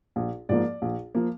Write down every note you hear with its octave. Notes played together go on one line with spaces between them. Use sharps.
A#1
G#2 F3 A#3 D5
A#1
F3 A#3